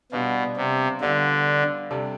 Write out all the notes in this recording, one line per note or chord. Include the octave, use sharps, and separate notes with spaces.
B2 G3 B3 D4 F4
C3
D3 G3 B3 D4 F4
C3 G3 D4 A4